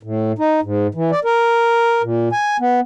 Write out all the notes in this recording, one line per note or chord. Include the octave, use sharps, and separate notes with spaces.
A2
D#4
G#2
E3
D5
A#4
A#2
G#5
B3